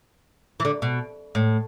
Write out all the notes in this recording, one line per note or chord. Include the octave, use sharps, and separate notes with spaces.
E3
D3
B2
A2